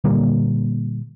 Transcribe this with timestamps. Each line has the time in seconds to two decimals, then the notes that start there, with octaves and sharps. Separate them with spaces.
0.04 A#2 D3 G3 A#3